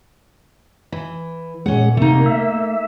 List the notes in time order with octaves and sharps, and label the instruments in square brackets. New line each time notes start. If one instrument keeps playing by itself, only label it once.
[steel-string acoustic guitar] E3
[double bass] A#2 [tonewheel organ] G#3 [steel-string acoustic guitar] C#4 F#5
[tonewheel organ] C3 [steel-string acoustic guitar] A3 D#4 [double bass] A#3
[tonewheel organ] E5